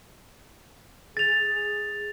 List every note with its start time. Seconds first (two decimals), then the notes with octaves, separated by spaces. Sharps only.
1.17 G#4 A6 F7